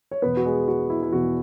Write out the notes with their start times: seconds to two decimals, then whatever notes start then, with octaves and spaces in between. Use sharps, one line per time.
0.11 C#5
0.22 E2 B2 B3 B4
0.37 F#4
0.45 G#3 G#4
0.68 F#4
0.90 E4
1.03 E4
1.13 E2 B2 B3 F#4